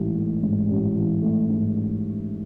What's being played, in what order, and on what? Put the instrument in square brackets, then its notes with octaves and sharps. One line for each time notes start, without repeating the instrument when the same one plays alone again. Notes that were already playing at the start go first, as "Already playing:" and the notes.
Already playing: [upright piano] A1 G#2 E3
A3
G#2
A1
E3
A3
G#2